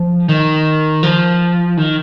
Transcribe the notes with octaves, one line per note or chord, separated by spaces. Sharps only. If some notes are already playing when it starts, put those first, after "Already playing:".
Already playing: F3
D#3
F3
D#3